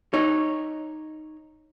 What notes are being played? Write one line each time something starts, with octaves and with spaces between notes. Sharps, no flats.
D#4 C#5